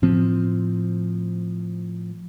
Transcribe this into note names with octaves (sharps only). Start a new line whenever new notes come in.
A2 F3 C4